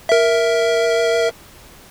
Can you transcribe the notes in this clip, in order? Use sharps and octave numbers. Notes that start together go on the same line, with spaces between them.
A#4 E5